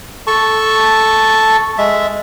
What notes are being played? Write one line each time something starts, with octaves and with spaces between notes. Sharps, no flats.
A4 A5 C#6
G#3 E5